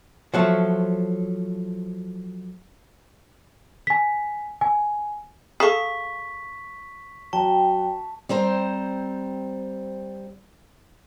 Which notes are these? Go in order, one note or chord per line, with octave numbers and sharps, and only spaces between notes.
F3 F#3 A3
G#5 B6
G#5
G#4 A4 F5 C#6 B6
F#3 F#4 G5 A5
G3 C4 C5 A#5